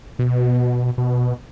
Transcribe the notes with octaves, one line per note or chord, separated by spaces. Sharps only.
B2
B2